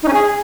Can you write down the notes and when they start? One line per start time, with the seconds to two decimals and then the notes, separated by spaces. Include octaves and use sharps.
0.03 D#4
0.08 C#4
0.13 G#4